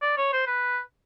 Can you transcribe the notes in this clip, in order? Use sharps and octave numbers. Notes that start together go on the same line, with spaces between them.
D5
C#5
C5
B4